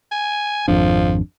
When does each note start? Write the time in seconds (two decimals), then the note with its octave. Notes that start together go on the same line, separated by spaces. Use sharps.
0.12 G#5
0.68 G#1 F2 F3 D4